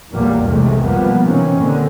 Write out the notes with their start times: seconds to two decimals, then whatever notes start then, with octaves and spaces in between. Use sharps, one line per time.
0.11 B1 E2 A#2 F#3 G3 A#3
0.44 B1 E2 C3 D#3 G#3 A3
0.83 B2 D#3 F3 G3 A#3 B3
1.21 C3 D#3 E3 C4 C#4
1.56 D#2 A#2 D3 D#3 C4